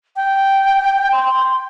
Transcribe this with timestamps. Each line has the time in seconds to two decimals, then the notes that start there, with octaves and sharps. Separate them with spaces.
0.16 G5
1.12 C6